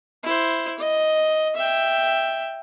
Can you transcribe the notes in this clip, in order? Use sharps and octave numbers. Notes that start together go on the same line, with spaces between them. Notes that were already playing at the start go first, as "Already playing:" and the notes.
E4 C5
D#5
E5 G5